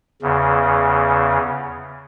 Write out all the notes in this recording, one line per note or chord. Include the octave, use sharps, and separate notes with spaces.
E2 C#3